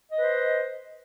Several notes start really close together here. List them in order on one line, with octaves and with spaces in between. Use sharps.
D#5 B4 C5